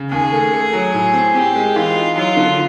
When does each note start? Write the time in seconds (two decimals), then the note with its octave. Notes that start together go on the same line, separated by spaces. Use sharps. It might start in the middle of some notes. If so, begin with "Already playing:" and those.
Already playing: C#3
0.11 D#2 G#4
0.32 A3
0.53 A3
0.73 F#3
0.94 A2
1.14 C4
1.35 C4 G4
1.56 G#3
1.75 E3 F4
1.95 D#4
2.16 F#3 F4
2.36 D3